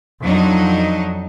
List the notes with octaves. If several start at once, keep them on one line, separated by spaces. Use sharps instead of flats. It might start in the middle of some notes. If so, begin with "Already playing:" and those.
F2 F#3 D4 D#4